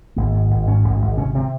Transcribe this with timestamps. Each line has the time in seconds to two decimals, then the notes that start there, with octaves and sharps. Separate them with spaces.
0.16 G#1 A#3
0.34 G#2
0.50 G#1
0.67 G#2 C#4
0.84 G#1
1.02 G#1
1.17 C3 C#4
1.35 C3 C4